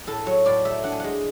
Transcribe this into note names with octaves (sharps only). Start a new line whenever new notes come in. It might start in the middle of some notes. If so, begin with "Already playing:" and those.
A2 A4
F#3 C#5
A2 D5
A3 E5
D4 F#5
G#5
G#3 F#5